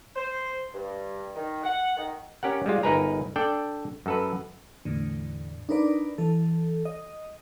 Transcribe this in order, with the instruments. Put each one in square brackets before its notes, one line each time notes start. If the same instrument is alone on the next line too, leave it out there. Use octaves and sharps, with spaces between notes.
[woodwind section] C5
G2
D#3
F#5
D#3
[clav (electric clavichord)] C#4 G4 A#4 F#5
G3 G#3 F4
G1 D#4 A#4 B4 G#5 A#5
D4 A4 D5 G5
F#2 A4 B4
[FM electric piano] E2 A2 D3
D4 D#4 A#4 B4 D5
E3 A4
D#5